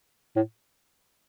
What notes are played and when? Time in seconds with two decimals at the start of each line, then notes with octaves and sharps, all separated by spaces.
0.36 A2